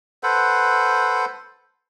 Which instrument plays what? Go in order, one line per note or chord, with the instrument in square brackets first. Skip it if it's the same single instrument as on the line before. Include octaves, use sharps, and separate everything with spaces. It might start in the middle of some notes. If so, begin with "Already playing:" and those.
[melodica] A4 B4 C5 F#5